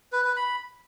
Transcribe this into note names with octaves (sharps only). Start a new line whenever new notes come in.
B4
B4
B5